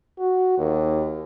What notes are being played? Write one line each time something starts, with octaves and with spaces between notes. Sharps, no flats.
F#4
D#2